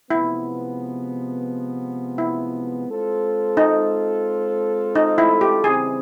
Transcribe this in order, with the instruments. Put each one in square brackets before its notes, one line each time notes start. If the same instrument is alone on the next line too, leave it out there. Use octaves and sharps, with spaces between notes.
[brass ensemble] C3 F3 G#3 B3 [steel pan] E4
[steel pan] E4
[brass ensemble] G#3 C4 F4 A4 C5
[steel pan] D#4
D#4
E4
G4
[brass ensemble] C#3 E3 G3 C4 [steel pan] G#4